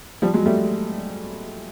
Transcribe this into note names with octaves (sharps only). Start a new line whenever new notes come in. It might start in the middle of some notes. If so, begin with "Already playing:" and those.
F3 G3
F#3 G#3
G3 A3